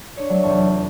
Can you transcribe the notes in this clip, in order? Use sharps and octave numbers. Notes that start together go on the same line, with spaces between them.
D4 C#5
F#3 A3
F1 E2 A5 C#6